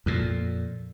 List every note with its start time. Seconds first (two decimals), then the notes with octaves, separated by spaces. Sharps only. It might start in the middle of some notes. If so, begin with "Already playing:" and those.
0.06 F2 A#2